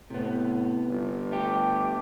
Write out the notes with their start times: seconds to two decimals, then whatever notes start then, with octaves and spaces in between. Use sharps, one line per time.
0.10 A2 C3 B3
0.88 G1
1.32 A3 G4